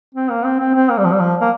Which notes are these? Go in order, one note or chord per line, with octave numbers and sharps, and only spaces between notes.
C4
A#3
C4
C4
C4
A#3
G3
F3
G3
F3
A#3